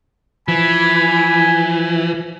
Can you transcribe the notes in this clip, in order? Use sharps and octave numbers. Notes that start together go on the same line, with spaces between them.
E3 F3 G#5 B5